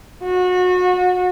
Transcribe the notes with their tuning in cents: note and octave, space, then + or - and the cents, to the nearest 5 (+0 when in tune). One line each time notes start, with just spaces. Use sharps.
F#4 -30